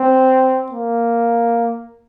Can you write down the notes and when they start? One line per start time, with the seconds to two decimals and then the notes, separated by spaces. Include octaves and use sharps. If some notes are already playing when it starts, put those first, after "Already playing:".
Already playing: C4
0.72 A#3